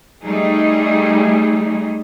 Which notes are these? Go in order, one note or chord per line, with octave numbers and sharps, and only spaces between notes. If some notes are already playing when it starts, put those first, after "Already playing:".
G3 A3 D#4 G#4